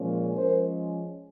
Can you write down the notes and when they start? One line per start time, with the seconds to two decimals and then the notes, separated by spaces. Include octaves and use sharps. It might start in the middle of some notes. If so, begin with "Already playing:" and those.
Already playing: A#2 F3 G#3 C#4
0.35 F3 G#3 C#4 A#4 C5